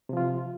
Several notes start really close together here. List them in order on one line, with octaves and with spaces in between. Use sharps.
C3 F3 F4